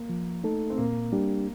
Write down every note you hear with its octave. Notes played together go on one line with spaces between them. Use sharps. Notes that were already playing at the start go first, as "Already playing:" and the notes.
Already playing: A#3
F3
A3 D#4 A4
C4
A#2 A#3
G3 D4 G4